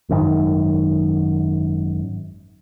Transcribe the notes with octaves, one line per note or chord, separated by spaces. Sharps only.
G#1 F#2 D3 D#3